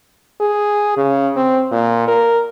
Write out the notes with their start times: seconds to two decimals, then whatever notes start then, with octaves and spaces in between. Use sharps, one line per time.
0.40 G#4
0.97 C#3
1.36 C4
1.71 A#2
2.08 A#4